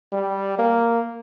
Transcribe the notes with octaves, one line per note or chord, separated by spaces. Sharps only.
G3
A#3